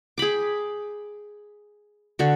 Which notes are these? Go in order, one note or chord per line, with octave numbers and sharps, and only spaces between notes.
G#4 G5 B5 D6
D3 F#4